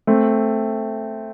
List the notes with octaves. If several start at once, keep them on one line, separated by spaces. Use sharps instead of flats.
A3 C4